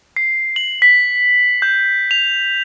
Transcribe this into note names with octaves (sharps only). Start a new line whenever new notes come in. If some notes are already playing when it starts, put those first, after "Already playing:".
C7
F#7
B6
G6
F7